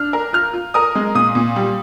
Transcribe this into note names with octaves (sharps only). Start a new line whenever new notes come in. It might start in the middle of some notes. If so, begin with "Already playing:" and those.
Already playing: D4 F6
A#4
F4 F6
F4
A#4 D#6
G#3
A#2 D#6
A#2
G3